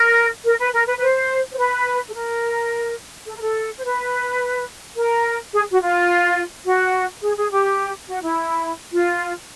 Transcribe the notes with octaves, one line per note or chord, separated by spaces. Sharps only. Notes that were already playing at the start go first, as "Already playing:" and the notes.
Already playing: A#4
A#4
B4
A#4
B4
B4
C5
C5
B4
A4
A#4
A4
A#4
A4
C5
B4
A#4
G#4
F#4
F4
F#4
G#4
G#4
G4
F#4
E4
F4